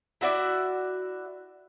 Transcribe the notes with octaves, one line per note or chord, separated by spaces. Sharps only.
E4 F#4 D5 E5